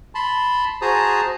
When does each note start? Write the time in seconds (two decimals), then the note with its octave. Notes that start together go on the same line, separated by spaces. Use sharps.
0.15 A5 B5 C6
0.82 F#4 G#4 C5 A5 A#5 D#6